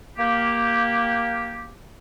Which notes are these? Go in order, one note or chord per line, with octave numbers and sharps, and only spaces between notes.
A#3 G4